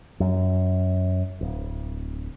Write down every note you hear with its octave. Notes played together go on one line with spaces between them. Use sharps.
F#2
D1